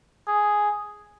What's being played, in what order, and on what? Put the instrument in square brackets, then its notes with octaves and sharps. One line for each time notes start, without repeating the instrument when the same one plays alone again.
[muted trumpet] G#4